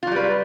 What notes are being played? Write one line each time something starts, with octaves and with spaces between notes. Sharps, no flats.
F#3 G3 F4 B4